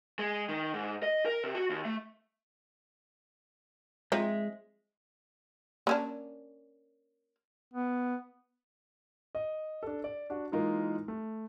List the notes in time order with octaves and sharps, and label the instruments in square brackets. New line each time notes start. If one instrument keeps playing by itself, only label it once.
[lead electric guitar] G#3
D#3
G#2
D#5
A#4
C3
F#4
D#2
A3
[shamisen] F3 C4 D#4 [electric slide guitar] G#3 [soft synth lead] E5
[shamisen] A#3 C#4 D4
[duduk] B3
[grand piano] D#5
D4 A4
D5
D4 F#4
E3 G#3 A#3 D#4 F4 A#4
A3